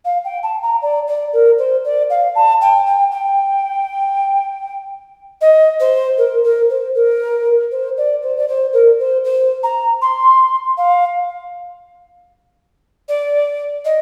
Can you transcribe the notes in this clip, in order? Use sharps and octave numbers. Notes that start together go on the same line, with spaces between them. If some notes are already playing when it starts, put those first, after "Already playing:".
F5
G5
A5
A#5
D5
D5
A#4
C5
D5
F5
A5
G5
G5
G5
D#5
C5
A#4
A#4
C5
A#4
C5
D5
C5
D5
C5
A#4
C5
C5
A#5
C6
F5
D5
D#5